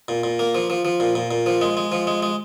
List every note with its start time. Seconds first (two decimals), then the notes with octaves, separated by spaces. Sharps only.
0.08 A#2
0.24 A#2
0.39 A#3
0.55 F3
0.70 F3
0.85 F3
1.00 A#2
1.15 A#2
1.31 A#2
1.46 F3
1.61 G#3
1.77 G#3
1.92 F3
2.07 G#3
2.23 G#3